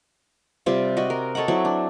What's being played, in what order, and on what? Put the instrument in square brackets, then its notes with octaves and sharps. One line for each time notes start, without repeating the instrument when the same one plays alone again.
[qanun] C3 G3 C4 F4
F#4 D#5
A#4
A4 C#5 D#5 F#5
F#3 C4 E4
D4